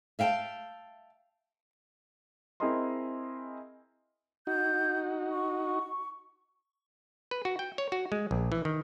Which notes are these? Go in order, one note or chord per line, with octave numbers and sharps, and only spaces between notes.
E5 F5 G5 A5
C4 E4 G#4 A#4 D#5 C6
D#4 F#4 G6
C#6
B4
F#4
G5
C#5
F#4
G#3
A#1
E3
D#3